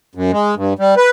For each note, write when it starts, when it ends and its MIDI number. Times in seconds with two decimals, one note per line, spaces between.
0.15 0.31 42
0.32 0.55 56
0.56 0.73 43
0.79 0.95 55
0.97 1.10 71